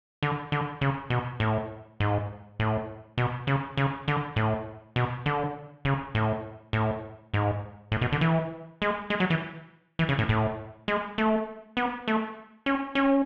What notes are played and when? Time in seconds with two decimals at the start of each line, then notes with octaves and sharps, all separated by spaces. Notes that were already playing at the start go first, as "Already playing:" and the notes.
0.23 D3
0.52 D3
0.81 C#3
1.10 B2
1.40 A2
2.00 G#2
2.60 A2
3.18 B2
3.47 C#3
3.77 C#3
4.08 D3
4.36 A2
4.96 B2
5.26 D3
5.85 C#3
6.15 A2
6.73 A2
7.34 G#2
7.92 A2
8.02 B2
8.12 D3
8.21 E3
8.82 G#3
9.10 G#3
9.20 F#3
9.30 E3
9.99 E3
10.09 C#3
10.19 A2
10.29 A2
10.88 G#3
11.18 A3
11.77 B3
12.08 A3
12.66 C#4
12.95 C#4